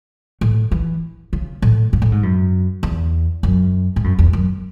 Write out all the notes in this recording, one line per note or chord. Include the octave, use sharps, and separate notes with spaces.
A2
E3
C#3
A2
G#2
A2
G#2
F#2
E2
F#2
G#2
F#2
E2
F#2